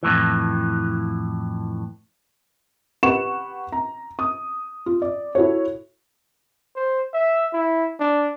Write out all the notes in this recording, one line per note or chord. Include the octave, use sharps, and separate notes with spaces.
F2 A2 E3
G4 B4 F#5 C#6 E7
A#5
D#6
F4
D5
E4 F#4 A4 C#5
C5
E5
E4
D4